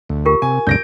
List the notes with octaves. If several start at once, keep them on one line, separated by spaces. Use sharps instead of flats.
D2
F4 G4 A#4
C3 G#5
D2 G2 C3 G6 A#6 D7